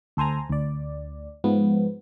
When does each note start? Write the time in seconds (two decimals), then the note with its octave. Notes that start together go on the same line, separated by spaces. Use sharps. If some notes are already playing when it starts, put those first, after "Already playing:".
0.17 D2 A4 C5 G#5 A#5
0.50 D2 D5
1.44 G#2 F3 B3